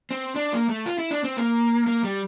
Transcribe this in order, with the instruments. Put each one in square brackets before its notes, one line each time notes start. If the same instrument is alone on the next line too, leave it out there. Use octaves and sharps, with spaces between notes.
[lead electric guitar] C4
D4
A#3
A3
F4
E4
D4
C4
A#3
A#3
G3